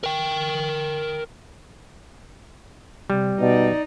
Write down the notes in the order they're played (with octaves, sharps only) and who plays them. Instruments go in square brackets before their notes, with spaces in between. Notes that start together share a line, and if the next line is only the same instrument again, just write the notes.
[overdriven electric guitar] A#4 G5
[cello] C3 [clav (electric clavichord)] G3
[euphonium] B2 [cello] D#4 [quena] D5